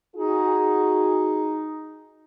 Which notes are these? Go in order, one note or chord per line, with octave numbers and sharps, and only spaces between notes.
D#4 F#4 G#4